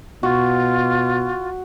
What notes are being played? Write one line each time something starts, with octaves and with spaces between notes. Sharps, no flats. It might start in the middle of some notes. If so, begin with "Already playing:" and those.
B2 F4 F#4